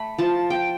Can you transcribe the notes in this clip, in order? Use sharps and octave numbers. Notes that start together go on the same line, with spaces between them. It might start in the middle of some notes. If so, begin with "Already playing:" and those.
Already playing: A3 B5
F3 A5
G5